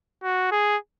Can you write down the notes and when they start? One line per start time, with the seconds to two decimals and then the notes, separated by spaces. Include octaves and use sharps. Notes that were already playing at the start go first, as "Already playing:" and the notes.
0.23 F#4
0.51 G#4